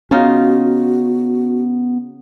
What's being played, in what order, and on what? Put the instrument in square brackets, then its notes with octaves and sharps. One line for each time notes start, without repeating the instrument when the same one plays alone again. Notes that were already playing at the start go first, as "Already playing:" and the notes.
[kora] C#3 D#4 F4 [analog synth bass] B3 [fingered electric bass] C#4 [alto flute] F#4